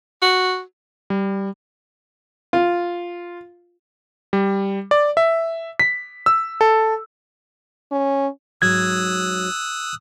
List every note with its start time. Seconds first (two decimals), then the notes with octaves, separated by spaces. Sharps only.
0.22 F#4
1.10 G3
2.53 F4
4.33 G3
4.91 D5
5.17 E5
5.79 B6
6.26 E6
6.61 A4
7.91 C#4
8.62 G#2 F#3 G#3 D#6 E6 F#6 G#6